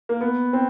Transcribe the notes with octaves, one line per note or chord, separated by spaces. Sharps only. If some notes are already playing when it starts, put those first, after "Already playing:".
A#3
B3
C4